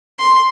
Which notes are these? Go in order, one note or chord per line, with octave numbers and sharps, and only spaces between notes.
C6